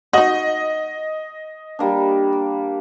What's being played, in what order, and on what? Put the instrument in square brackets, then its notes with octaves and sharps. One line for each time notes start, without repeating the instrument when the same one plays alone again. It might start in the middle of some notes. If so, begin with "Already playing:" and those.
[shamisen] D#4 F#4 [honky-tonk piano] D#5
[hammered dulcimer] G3 A#3 D4